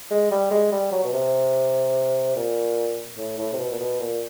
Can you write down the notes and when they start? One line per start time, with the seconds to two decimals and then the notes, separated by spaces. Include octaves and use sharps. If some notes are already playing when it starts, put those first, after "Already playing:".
0.11 G#3
0.31 G3
0.51 G#3
0.72 G3
0.92 F#3
1.04 B2
1.13 C3
2.36 A#2
3.18 A2
3.38 A2
3.53 C3
3.59 B2
3.71 A#2
3.79 B2
4.00 A#2